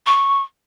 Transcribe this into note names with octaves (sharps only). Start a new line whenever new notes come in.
C#6